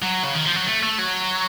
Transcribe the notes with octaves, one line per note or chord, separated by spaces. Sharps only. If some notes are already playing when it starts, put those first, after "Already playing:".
F#3
C#3
D#3
F3
F#3
A3
A3
F#3